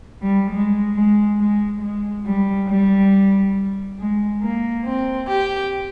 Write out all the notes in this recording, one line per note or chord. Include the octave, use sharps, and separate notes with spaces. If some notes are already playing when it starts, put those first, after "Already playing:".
G3
G#3
G#3
G#3
G#3
G3
G3
G#3
A#3
C4
G4